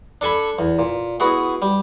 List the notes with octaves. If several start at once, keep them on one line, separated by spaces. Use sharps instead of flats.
D4 A4 G#5 B5
E2
A#2
B3 E4 F#4 G#4
G3